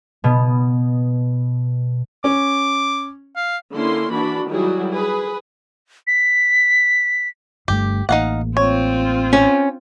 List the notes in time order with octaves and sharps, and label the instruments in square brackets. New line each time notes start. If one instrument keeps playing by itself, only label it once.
[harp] B2 B3
[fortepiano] C#4 [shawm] D6
[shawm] F5
[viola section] D3 A#3 C#4 E4 C6
E3 D4 F#4 B5
D#3 F#3 G3 E4 F#4 G#4
G#4 B4
[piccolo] B6
[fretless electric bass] G1 G2 A3 [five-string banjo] G4
[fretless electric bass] A1 A#3 [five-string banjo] D#4 F5 F#5
[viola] C4 F4 [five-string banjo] C#5
[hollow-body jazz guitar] C#4